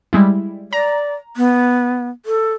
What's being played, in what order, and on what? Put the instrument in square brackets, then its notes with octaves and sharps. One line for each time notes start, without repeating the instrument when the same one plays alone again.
[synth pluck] G3 G#3 E4
[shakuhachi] D5 [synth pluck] A#5
[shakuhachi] B3
A4